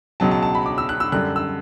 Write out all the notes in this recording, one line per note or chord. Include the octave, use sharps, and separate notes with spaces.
C#2 B2 F#3 A5
A5
A5
B5
D6
E6
F#6
E6
F#2 D3 G3 F#6
E6